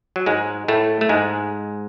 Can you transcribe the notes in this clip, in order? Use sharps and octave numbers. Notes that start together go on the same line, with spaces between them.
F#3
G#2 G#3
A2 A3
A3
G#2 G#3